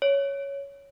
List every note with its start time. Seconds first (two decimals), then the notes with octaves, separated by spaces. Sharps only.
0.02 C#5